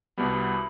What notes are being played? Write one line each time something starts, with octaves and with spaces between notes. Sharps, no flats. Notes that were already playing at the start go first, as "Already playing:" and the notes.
C2 B2 G3 B3 B5